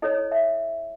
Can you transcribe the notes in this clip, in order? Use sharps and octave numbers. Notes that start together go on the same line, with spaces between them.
E4 A4 C#5 D#5
E5